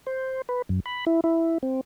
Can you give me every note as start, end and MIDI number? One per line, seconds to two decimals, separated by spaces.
0.07 0.42 72
0.49 0.62 71
0.69 0.80 42
0.86 1.05 83
1.07 1.21 64
1.24 1.58 64
1.63 1.81 60